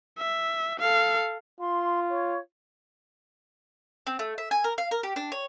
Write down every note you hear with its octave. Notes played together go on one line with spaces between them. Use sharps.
E5
A4 F5
F4 C6
C#5
C4
A3
E5
G#5
A#4
F5
A#4
G4
D4
C#5